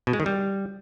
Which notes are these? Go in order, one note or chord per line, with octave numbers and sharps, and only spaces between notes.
B2
G#3
D#3
G3